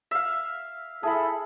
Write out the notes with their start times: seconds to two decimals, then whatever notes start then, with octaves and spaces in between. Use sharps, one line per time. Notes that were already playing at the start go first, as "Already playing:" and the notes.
0.11 E5 F5
1.03 E4 G#4 A4 A5 B5